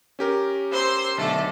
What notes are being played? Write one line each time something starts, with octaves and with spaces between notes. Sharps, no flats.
C#4 G4 A#4
C5 C6 E6
B1 D3 A3 A4